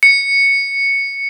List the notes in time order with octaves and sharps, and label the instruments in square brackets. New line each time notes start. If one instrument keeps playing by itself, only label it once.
[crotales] C#7